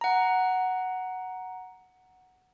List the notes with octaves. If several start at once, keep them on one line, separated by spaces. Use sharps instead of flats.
F#5 A#5